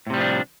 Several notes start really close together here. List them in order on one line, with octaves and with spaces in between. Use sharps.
A2 C3 G3 F3 D4